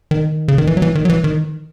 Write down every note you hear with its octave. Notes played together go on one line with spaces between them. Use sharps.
D#3
C#3
D#3
E3
F#3
E3
D#3
F#3
E3
D#3